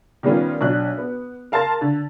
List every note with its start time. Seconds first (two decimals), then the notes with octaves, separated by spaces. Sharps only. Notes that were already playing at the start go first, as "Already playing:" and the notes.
0.23 D#3 G3 A#3 B3 C#4 F4
0.61 B1 D4 F#6
0.98 B3
1.52 A#4 F5 A5 C6 A6
1.81 D3